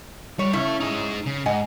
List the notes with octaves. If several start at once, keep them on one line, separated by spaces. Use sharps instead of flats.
G3 C#5
C#3 C#4 E4 A4 E5
D#4 G#4
C#3
G#2 D#5 F#5 G#5